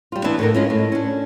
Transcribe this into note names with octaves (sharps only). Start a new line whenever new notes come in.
G3 F4
E3 B3 D4 B4 E5
A2 D3 A#4
G#3 C#4 F4
A2
C#4 D4